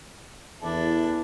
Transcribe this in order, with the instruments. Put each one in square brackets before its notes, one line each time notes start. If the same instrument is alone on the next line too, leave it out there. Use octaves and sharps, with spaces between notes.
[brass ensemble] E2 [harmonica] D4 E4 A4